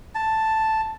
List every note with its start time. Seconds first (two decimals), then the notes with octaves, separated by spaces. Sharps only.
0.15 A5